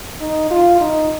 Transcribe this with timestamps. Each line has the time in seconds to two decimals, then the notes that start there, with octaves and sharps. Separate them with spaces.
0.20 D#4
0.50 F4
0.81 D#4